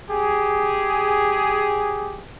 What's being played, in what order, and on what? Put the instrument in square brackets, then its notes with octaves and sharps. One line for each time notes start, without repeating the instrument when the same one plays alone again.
[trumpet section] G4 G#4